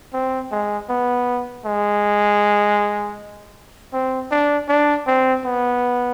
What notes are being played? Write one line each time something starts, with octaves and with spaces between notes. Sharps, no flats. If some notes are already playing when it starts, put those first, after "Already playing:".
C4
G#3
B3
G#3
C4
D4
D4
C4
B3